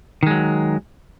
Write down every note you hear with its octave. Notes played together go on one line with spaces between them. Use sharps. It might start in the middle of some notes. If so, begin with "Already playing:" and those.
D#3 F#3 G#3